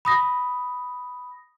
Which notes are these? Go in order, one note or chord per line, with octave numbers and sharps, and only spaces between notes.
B5 D#6 A#6